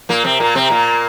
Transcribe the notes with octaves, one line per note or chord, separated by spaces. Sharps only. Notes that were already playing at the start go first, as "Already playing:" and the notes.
A#2 A#3
C3 C4
A#2 A#3
C3 C4
A#2 A#3